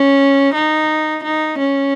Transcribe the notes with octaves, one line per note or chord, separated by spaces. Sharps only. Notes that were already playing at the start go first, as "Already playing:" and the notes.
Already playing: C#4
D#4
D#4
C#4